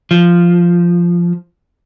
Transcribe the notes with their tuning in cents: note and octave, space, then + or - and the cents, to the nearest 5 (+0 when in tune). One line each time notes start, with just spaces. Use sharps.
F3 -5